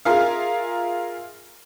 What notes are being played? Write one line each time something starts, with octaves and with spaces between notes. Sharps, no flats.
F4 G#4 A#4 E5 F5